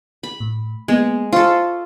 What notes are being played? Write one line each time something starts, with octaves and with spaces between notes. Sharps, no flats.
B5
A2
G#3 A#3 B3
F4 A4 C5 C#6